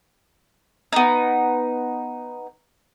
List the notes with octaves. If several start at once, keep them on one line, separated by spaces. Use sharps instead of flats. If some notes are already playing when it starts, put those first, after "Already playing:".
B3 D#4